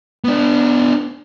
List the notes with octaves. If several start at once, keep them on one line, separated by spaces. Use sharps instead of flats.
B3 D4